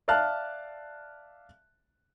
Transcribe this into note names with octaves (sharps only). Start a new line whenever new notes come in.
D5 E5 F5 A5 F6 F#6